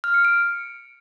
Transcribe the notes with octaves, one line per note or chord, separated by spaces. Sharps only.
F6
C#7
D7